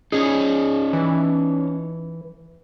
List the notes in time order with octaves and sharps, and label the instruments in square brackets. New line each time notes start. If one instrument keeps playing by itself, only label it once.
[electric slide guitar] C#4 D#4 [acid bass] G#4
[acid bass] E3